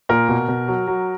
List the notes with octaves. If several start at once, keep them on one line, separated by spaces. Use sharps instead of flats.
A#2 A#4
B2
B2
F#3
F#3